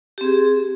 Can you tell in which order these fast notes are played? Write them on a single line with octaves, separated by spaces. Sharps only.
G4 C4 G#4